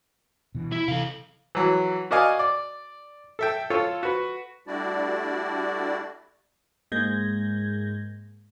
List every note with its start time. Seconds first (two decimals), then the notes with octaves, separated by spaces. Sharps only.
0.55 B2 E3
0.72 E4
0.88 C3 E3 A4 F5
1.55 E3 F#3
2.11 F#4 A#4 D5 D#5 F5 G#5
2.39 D5
3.39 A4 E5 G5
3.70 F4 A4 C#5 E6
4.03 F#4 B4
4.67 G3 A3 D4 E4 F#4 D5
6.92 G#2 G#3 A#3 G6 G#6 A#6